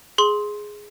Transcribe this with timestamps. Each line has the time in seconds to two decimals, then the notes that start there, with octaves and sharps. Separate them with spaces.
0.18 G#4 C6 F#7